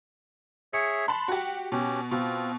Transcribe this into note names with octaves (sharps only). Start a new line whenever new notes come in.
G#4 C#5 E5 C#7
A5 B5 C6 F#6
F#4 G4
B2 C#4 G4
B2 C4 F4